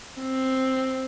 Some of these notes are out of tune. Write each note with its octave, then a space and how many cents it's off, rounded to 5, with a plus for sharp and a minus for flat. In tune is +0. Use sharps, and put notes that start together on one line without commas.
C4 +5